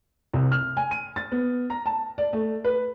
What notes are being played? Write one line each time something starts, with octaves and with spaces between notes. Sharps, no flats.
C2
F6
G#5
D#7
A6
B3
A#5
A5
D5
A3
B4